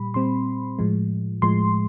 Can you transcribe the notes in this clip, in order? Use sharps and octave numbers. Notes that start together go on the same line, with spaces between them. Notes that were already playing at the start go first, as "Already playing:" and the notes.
Already playing: A#2 G3 B5
A#2 G3 C4 C6
A2 F3 G#3
A2 F3 G#3 C6